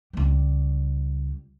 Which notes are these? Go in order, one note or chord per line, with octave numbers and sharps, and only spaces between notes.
C#2 G3